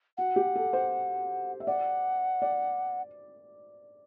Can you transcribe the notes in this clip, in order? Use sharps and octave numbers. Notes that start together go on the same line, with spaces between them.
F#4 F#5
G4
A4
C5
E5
D5 F#5
D5